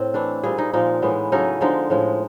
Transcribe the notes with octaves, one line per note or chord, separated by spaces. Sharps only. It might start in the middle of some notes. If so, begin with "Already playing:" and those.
Already playing: A2 C4
E3 A3 D4
A#2 G3 C4 G#4
D#4
A#2 F3 G#3 D#4
A2 E3 G#3 B3
C#3 F#3 A3 C#4 D#4
D3 F3 G#3 D#4
A2 F3 G#3